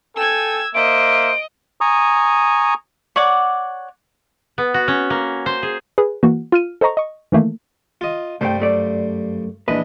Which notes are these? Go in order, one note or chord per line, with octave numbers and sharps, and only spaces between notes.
A4 G5 G#5 E6 G#6
A#3 C5 D#5 E5 D7
G#5 A#5 C#6 D#6
C#5 D5 F#5 D6
B3
F#4
C#4
A#3
C5
G#4
G#4 B4
E3 A#3 F#4
F4 F6 D#7
A4 C5 D#5 A#5 C#6
D#5 C#6
D#3 E3 A3 A#3
F4 D#5
C2 G2 G3 A3 C5 G5
F#2 A3 D5
A#1 E3 D4 B4 D#5